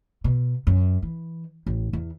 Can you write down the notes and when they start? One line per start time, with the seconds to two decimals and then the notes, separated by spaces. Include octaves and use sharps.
0.24 B2
0.67 F#2
1.02 E3
1.66 A1
1.93 E2